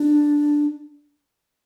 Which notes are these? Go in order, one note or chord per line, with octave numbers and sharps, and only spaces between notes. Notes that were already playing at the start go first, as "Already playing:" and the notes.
Already playing: D4